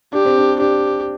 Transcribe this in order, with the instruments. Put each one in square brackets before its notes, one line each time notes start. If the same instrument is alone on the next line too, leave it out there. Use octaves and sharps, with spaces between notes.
[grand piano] D4 [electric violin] G4
[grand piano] C4
D4
[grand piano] D4 [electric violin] G4